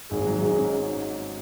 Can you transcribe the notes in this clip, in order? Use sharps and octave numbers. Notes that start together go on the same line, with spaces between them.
G#1 G#4
F#3
G#2 G#4
C#4